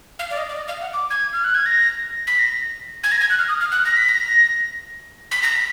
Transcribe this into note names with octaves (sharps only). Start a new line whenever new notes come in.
F5
D5
D#5
D5
D#5
F5
F#5
D6
G#6
F6
F#6
G#6
A#6
B6
A#6
G#6
A#6
G#6
F#6
F6
D#6
F6
F#6
A#6
B6
A#6
B6
A#6
B6